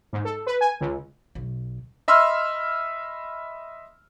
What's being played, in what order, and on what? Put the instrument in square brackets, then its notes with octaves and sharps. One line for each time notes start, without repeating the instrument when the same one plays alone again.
[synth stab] G#2
A4
B4
G#5
C#2
[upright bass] B1
[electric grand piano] D#5 E5 B5 C6 E6 F6